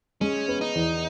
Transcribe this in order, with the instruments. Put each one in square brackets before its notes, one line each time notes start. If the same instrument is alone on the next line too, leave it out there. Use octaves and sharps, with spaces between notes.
[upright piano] G#3 [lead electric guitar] C#4
[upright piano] B3
[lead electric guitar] D#4
[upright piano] E2